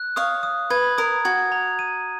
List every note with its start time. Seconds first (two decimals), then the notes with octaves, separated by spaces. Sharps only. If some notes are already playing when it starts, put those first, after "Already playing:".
Already playing: F#6
0.16 C#5 F5 D#6
0.43 D#6
0.70 B4 G#6
0.98 A#4 D#6
1.25 F#4 G#6
1.52 A#5
1.79 D#7